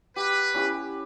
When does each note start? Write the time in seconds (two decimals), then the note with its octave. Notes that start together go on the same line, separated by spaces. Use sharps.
0.16 G4 B4
0.54 C#4 E4 G4